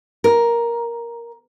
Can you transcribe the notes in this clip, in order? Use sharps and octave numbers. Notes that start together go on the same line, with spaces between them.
A#4